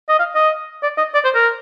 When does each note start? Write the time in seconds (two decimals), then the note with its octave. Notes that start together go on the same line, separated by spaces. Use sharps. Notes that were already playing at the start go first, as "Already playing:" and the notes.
0.09 D#5
0.19 F5
0.36 D#5
0.83 D5
0.98 D#5
1.14 D5
1.24 C5
1.35 A#4